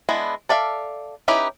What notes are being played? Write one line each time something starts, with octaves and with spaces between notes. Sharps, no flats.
G#3 B3 D4 E4
A4 D5 E5 F5
C#4 D#4 E4 G4 B4